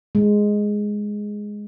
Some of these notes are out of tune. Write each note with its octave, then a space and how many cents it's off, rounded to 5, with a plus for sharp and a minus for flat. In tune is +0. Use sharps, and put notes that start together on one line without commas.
G#3 +0